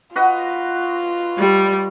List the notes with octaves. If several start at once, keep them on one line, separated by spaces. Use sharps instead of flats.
F4 F#4 B4 D#5
G3